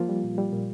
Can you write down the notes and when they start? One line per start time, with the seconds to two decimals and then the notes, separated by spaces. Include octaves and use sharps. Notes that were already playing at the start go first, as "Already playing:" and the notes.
Already playing: F3 A#3 F4
0.09 G3
0.24 A#2
0.38 G3
0.53 A#2